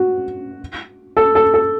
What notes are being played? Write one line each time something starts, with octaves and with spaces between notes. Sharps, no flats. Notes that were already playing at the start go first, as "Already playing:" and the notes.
Already playing: F#4
A4
A4
A4